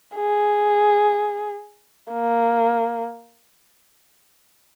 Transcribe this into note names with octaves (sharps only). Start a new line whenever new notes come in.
G#4
A#3